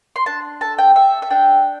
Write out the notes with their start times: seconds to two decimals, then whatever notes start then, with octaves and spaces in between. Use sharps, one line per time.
0.16 C6
0.26 D4 A5
0.61 A4 A5
0.78 G5
0.95 A4 E5
1.22 E5
1.30 D4 G5